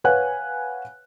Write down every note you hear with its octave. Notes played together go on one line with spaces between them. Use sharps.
B4 C#5 F5 F#5 G#5 F#6